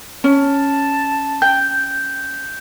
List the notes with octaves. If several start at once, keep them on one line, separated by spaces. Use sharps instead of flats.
C#4 A5
G5 G6